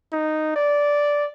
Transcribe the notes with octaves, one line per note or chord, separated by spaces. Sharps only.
D#4
D5